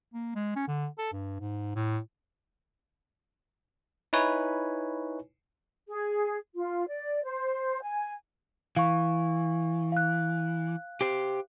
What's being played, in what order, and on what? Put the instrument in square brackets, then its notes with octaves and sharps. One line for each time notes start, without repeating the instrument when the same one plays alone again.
[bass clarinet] A#3
G#3
C#4
D3
A4
G2
G#2
A2
[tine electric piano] D#4 E4 B4 C#5 G#5
[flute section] G#4
F4
D5
C5
G#5
[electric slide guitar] E3 [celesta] F5 C#6
[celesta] F5 F#6
[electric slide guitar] G4 C5